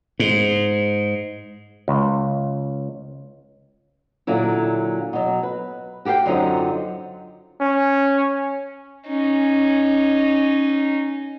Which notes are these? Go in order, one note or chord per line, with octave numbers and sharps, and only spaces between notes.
G#2
C#2
A#2 D3 F#3 E4
B2 F#3
B4
F#4 G4 A4 F5 G5
F#2 D3 F#3 C4 D#4 F4
C#4
C#4 D#4